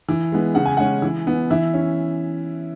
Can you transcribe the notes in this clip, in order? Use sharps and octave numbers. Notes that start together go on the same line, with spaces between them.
E3
G#3 B3
C#3 F#5
G#5
G#3 C#4 F#5
E3
B3
E3 E5
C#4